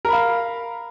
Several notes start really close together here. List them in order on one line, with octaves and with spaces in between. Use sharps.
A#4 B5 F5